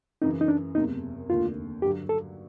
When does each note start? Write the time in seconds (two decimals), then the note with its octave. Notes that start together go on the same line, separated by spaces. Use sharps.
0.22 F#2 C#3 E3 D#4
0.41 D#4
0.48 D4
0.75 F#1 E2 C3 D#4
1.29 F1 D#2 D3 F4
1.82 G2 D3 F#3 G4
2.09 A4